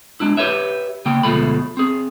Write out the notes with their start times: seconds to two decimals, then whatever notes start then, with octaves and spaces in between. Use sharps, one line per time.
0.20 G#3 D4 E4
0.37 G4 B4 C#5 E5
1.05 C#3 A#3 G5
1.23 D2 B2 F3 G#3 A3 B5
1.77 C4 G#4